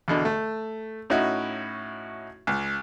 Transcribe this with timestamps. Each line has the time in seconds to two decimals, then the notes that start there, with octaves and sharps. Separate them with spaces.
0.08 E2 B2 D3
0.25 A3
1.10 A2 C#4 D#4 E4 F#4
2.47 C#2